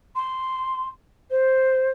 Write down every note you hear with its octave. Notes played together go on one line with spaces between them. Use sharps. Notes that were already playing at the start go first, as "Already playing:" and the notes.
C6
C5